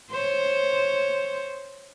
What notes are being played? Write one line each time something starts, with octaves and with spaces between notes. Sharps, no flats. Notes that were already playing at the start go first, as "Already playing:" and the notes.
C5 C#5